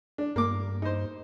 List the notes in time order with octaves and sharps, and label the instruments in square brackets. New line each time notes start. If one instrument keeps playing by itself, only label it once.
[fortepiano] D4
[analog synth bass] G2 [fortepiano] A#3 D6
[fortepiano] D#4 C5